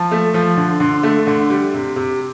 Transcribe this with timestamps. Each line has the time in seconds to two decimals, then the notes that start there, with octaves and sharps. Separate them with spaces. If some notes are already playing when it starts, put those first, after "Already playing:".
Already playing: F3 A5
0.11 A3
0.34 F3
0.57 D3
0.80 D3 C6
1.03 A3
1.27 D3
1.50 G3
1.74 C3
1.96 C3